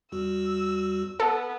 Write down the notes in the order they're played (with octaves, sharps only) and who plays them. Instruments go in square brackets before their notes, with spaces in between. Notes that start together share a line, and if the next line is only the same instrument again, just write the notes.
[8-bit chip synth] E2 G3 F#4 [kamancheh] E6
[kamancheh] B3 [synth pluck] A4